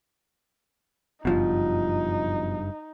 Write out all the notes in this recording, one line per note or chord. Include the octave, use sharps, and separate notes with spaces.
F#1 G2 B2 F3 D#4